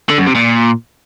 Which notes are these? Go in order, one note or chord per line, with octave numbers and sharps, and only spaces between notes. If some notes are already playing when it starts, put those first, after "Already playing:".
D3
F#2
C3
A#2